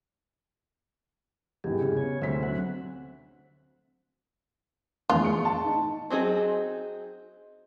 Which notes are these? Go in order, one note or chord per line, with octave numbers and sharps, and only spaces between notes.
G#1 E2 G4 G#4
C#3
B3 C#5 G#5
D2 C4 C5 E5 B6
F#3 C4 F#5
F1 E2 F4
C#6 C#7
A5
D#4
F#3 C4 D#4 G#4